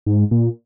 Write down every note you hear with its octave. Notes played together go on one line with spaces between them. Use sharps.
G#2
A#2